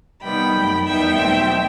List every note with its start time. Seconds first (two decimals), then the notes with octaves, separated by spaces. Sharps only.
0.22 C3 D#3 G3 B3 D#4 G5 B5
0.54 F#2 F#3 A3
0.86 E2 D#3 G3 B3 D#4 E5 G5
1.18 B2 F#3 A3 C4